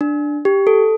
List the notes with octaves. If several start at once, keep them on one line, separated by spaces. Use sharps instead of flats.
D4
G4
A4